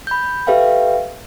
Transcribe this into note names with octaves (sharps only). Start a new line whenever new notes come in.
B5 G6
G4 A4 B4 E5 F5 G5